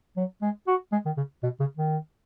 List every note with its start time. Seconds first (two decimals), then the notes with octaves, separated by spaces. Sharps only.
0.17 F#3
0.42 G#3
0.67 F#4
0.92 G#3
1.06 D#3
1.17 C#3
1.43 B2
1.60 C#3
1.77 D#3